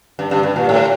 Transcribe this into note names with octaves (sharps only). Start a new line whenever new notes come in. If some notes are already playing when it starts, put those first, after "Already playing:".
G2
G2
G2
A#2
A2